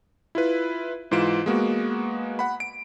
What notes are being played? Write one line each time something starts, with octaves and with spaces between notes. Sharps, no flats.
E4 F4 B4
G#2 E3 F4 D7 E7
G#3 A#3 B3 F#4
F#5 B5
D7